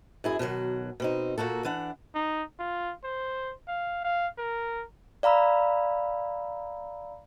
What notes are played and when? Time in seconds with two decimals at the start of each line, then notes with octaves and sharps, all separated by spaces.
0.24 F#2 E4 G#4
0.39 B2 D#3 F3 F#3
1.00 B2 C4 D#4
1.38 A#2 A#3 F#4 A4
1.65 E3 D4 F#5
2.15 D#4
2.59 F4
3.04 C5
3.68 F5
4.05 F5
4.38 A#4
5.23 D5 F5 A#5 B5 E6